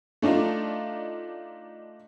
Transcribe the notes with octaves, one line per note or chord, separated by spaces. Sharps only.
A3 D4 D#4 F4